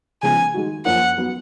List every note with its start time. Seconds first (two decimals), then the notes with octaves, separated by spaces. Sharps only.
0.22 C#3 F3 G#3 B3 G#5
0.54 D#3 G#3 D#4 F#4
0.85 F#2 F3 A#3 C#4 F#5
1.18 F#3 B3 F#4